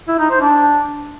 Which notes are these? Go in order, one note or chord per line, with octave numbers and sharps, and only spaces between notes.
E4
D#4
C5
D4